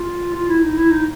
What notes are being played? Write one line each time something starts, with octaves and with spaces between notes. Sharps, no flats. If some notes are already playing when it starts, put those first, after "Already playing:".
Already playing: F4
F4
E4
D#4
E4
D#4